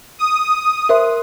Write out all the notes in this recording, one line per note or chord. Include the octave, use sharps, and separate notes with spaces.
D#6
A#4 C5 E5 C6